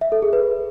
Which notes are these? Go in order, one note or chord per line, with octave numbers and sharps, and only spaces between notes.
E5
A4
G#4
B4